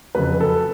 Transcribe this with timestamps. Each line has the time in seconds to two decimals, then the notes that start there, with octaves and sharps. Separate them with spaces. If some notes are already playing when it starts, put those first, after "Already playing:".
0.15 F2 C#3 F#3 B4
0.41 A4